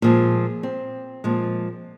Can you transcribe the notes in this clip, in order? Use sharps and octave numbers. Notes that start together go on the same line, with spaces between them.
A#2 F3 G#3 G#4
C4
A#2 F3 G#3